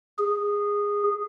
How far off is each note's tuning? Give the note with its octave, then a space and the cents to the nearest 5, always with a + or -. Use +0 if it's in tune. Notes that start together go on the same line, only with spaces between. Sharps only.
G#4 -15